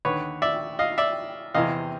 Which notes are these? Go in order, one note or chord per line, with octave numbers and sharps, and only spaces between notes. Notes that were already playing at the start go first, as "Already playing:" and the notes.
D#2 D3 B4 C#5
D5 E5
D#5 F5
D5 E5
E2 C3 E3 D#5 F5